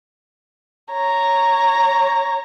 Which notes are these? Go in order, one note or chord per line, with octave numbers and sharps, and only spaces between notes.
C#5 A#5